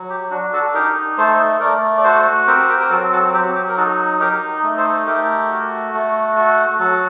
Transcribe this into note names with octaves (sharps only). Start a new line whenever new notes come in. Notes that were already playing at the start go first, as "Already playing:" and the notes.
Already playing: F#3
G4
D4 F#4
F#4 A4
D#4 G4 A#4
A3 A4 C5
A3 A#4 D5
D5
F#4 A4 C5
C4 G4 A#4
G4 A#4
A#4
F#3 F#4 A4
F#4 A4
F#3 G4
G4
A#4
D#4 F#4 A4
D#4 G4 A#4
A3
A4 C5
A3 G4 A#4
F#4
A3
F#4
F#3 F#4 A4